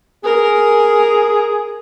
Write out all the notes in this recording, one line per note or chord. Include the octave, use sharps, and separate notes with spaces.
G#4 A#4